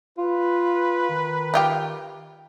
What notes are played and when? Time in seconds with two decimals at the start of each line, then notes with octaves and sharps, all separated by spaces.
0.18 F4 B4
1.10 D#3
1.54 D#4 F4 G4